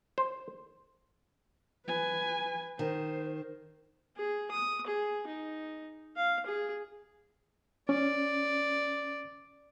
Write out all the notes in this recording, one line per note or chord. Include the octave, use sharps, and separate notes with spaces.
C5
B4 G#5
D#3 C5
G#4
D#6
G#4
D#4
F5
G#4
C#4 D5